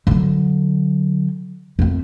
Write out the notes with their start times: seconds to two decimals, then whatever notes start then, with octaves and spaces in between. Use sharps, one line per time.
0.07 D3 F#3
1.79 F2 A3